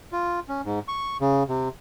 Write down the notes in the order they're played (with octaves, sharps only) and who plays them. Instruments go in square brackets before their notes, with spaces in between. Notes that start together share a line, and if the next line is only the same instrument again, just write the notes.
[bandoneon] F4
C#4
G#2
C#6
C#3
C3